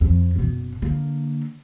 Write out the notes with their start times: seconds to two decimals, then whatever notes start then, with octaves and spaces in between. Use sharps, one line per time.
0.01 F2
0.36 F#1 B2
0.82 D3 A#3